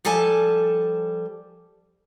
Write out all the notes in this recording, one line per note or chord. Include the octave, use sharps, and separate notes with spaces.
F3 G3 A4 G#5 A5